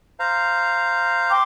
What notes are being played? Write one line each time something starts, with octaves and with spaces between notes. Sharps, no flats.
C5 F5 A#5
G5 C6 D6